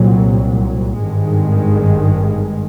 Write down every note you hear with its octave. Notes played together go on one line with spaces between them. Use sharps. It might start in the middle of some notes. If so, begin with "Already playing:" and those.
Already playing: C2 A#2 F#3
G#1 G2 D#3 G#3